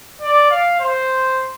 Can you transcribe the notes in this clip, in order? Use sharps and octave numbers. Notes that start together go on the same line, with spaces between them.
D5
F5
C5